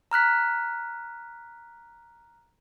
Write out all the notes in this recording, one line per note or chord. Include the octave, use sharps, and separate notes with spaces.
A#5 F6 F#6 B6